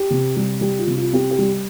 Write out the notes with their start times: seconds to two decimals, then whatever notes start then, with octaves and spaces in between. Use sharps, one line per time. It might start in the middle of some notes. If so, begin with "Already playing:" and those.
Already playing: G4
0.10 C3
0.36 G3
0.61 G3 G4
0.79 F4
0.87 C3
0.96 F4
1.13 C4 G4
1.30 G4
1.38 G3